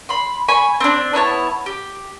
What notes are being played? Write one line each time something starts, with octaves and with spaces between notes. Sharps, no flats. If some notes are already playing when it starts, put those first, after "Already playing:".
B5 C6
G#5 B5 C#6
C4 D4
B3 E4 C#5 A5
G4